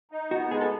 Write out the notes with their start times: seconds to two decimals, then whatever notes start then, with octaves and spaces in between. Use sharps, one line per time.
0.11 D#4
0.31 B3 F#4
0.51 G#3 G#4
0.61 A4